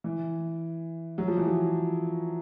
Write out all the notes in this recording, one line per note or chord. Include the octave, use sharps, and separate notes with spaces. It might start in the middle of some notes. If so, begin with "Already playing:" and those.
E3
F#3
F3
E3
F3